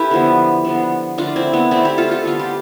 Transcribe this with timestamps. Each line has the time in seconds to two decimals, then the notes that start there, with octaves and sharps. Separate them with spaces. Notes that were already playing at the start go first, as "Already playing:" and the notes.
Already playing: E4 G4 A4 B4
0.11 D3 F3 B3
0.65 D3 F3 B3
1.18 D3 A3 D4 F4
1.36 C4 E4
1.53 B3 D4
1.71 D3 A3 C4 E4
1.85 E4 G4
1.98 F4 A4
2.11 F4 A4
2.25 D3 G3 B3 F4
2.39 G4